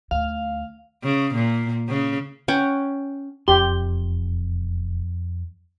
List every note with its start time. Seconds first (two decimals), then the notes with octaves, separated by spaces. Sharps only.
0.11 D2 F5
1.04 C#3
1.35 A#2
1.88 C#3
2.48 C#4 F#5 G5
3.48 E1 F2 G4 C6